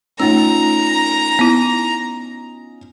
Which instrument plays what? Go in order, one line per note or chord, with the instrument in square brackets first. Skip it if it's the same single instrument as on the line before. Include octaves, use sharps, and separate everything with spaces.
[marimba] A3 E6 [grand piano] C#4 D#4 F4 [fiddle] A#5
[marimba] B3 E4